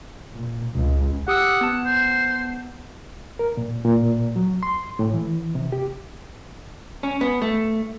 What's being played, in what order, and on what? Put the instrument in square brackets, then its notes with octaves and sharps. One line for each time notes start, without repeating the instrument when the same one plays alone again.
[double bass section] A#2
C#2
[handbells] G4 D#6 E6 [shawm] F#5
[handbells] B3 A5
[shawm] C5
[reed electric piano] A#4
A#2
A#2
F#3
C6
A2
E3
C3
G4
[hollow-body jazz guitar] C#4
B3
A3